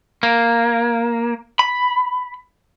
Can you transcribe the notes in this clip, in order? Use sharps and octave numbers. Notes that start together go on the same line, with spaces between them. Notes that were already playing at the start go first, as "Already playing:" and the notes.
A#3
B5